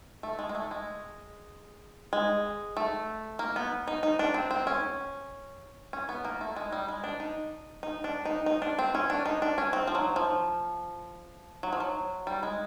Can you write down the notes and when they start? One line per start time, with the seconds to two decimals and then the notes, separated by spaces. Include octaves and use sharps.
0.23 A3
0.39 G#3
0.49 G#3
0.55 A3
0.71 G#3
2.13 G#3
2.77 A3
3.39 A#3
3.56 B3
3.87 D#4
4.03 D#4
4.19 D4
4.34 C4
4.51 C4
4.67 C#4
5.93 C#4
6.09 B3
6.25 A#3
6.41 A3
6.56 G#3
6.72 G3
6.88 G#3
7.04 D4
7.20 D#4
7.83 D#4
8.04 D4
8.25 D#4
8.46 D#4
8.62 D4
8.79 C4
8.95 C#4
9.10 D4
9.25 D#4
9.42 D4
9.58 C#4
9.73 C4
9.87 F3
9.95 F#3
10.16 F3
11.63 F#3
11.73 F3
11.80 F#3
12.27 G3
12.43 G#3